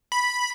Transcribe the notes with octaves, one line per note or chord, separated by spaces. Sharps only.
B5